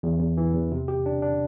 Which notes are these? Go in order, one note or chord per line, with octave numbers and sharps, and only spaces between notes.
E2
E2
E3
E2
C3
G4
D4
D4